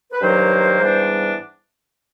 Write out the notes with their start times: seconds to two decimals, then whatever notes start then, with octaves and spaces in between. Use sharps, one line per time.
0.12 B4
0.21 G2 D#3 F#3 A#3 C5
0.77 G#2 E3 G3 B3 D4